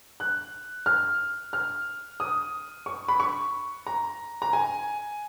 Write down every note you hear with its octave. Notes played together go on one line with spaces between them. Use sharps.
F#6
F6
F6
D#6
C#6
B5
C#6
A#5
A#5
G#5